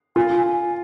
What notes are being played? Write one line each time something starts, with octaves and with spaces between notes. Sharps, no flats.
F4 G#5
G#5
G#5